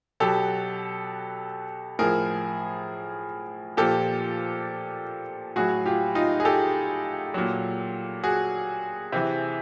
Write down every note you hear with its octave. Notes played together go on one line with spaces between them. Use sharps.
B2 F#3 G4 A4
A2 F3 G#4 A#4
A#2 F3 G4 A4
A2 F#3 F#4 G#4
F4 G4
D#4 F4
G#4
G4 A4
A#2 F#3
F#4 G#4
C3 E3